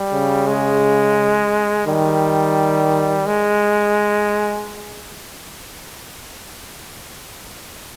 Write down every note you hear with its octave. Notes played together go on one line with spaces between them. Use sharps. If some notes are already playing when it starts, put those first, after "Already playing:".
Already playing: G3
C#3
G#3
D#3 G3
G#3